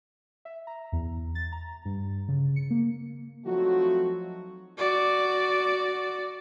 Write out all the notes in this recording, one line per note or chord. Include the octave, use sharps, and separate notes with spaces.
E5
A#5
E2
A6
A#5
G2
C#3
C#7
A#3
F3 F#3 A3 C4 D#4 F#4
F#4 D5